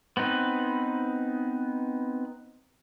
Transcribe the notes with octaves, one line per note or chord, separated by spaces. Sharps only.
B3 C4 D#4 B4